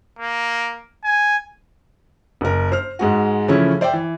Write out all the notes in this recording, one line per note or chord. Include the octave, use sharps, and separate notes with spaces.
A#3
G#5
F#1 A#4
C5 F6
G#2 G#3 F#4
C#3 E3 F3 A3 C#4 E4
C5 D5 E5 G5
E3